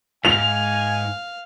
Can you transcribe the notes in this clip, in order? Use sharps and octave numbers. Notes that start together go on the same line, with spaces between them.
C#2 G#2 F5 G#5 F7